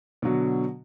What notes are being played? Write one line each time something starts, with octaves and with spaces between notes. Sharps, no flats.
B2 D3 F#3 F#4